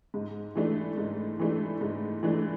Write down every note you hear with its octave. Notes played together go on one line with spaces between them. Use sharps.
G#2
E3 A3 D4
G#2
E3 A3 D4
G#2
E3 A3 D4